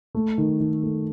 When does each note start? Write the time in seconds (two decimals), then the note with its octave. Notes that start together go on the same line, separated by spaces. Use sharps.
0.15 A3
0.38 D#3
0.60 D#3
0.83 A3